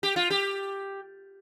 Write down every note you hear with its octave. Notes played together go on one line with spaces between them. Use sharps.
G4
F4
G4